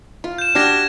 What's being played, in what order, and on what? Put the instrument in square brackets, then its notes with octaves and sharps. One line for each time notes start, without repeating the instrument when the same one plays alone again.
[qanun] F4
[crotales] G6 E7
[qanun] D4 F#4 G4 [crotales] F6 G#6 A#6